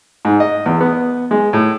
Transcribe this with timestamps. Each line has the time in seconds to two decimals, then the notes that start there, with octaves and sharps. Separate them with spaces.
0.25 G#2
0.40 D#5
0.66 E2
0.81 B3
1.31 G#3
1.53 A2